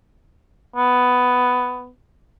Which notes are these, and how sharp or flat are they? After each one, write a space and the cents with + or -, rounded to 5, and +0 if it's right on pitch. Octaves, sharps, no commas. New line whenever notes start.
B3 +10